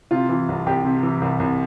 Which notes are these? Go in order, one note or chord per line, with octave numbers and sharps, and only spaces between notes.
C3 F4
E3
C2
C2 G4
C3
E3
C2
C2